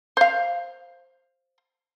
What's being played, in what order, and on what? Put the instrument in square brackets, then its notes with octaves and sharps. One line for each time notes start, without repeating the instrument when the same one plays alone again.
[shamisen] C5 F5